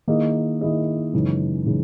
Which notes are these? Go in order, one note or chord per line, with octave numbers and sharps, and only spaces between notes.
D#3 A#3 E4 G#4 D#5
D#3 A#3 E4 G#4 D#5
F#2 C#3 E3 G#3 D#4
C#3 E3 G#3 D#4